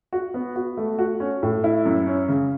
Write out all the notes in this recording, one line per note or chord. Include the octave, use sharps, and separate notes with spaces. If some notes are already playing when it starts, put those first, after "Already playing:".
F#4
B3
F#4
A3
F#4
C#4
A2
E4
F#2
C#4
C#3